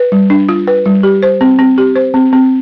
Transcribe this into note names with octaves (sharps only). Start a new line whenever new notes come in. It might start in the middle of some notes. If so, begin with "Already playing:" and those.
Already playing: B4
G3
D4
F4
B4
G3
G4
C5
C4
C4
G4
C5
C4
C4